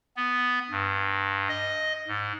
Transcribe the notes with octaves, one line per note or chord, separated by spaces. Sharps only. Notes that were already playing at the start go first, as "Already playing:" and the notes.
B3
G2
D#5
G#2